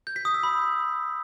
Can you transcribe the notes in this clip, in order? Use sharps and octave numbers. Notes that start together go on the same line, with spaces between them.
G6
B6
D#6
E6
B5